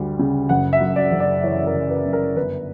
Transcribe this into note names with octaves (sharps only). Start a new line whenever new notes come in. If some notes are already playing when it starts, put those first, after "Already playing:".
Already playing: D2 G3
C#3
F#1 F#5
E5
F#2
D5
F#1
D5
E3 C#5
A#4
F#1
B4
F#2
A#4
G1 B4